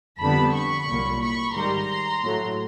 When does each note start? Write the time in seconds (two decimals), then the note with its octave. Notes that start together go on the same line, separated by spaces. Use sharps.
0.20 F2 D3 G3 B3 A5 B5
0.54 B5 C#6
0.88 C2 A#2 F#3 A#3
1.21 B5 C#6
1.55 G#2 D#3 G3 A#5 C6
2.23 A2 F#3 A3